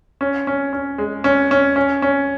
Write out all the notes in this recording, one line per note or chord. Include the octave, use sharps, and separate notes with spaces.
C#4
C#4
C#4
G#3
C#4
C#4
C#4
C#4